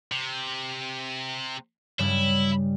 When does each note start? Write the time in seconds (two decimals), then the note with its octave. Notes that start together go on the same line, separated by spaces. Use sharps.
0.12 C3
1.99 G2 C#3 G3 E4